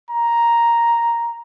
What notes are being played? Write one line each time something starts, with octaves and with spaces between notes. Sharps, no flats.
A#5